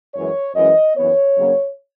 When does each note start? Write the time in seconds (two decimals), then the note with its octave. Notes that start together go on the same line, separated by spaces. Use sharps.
0.14 F#2 E3 G#3 C#5
0.55 F#2 E3 G#3 C#4 D#5
0.96 F#2 E3 B3 C#5
1.36 F#2 C#3 F#3 A#3 C#4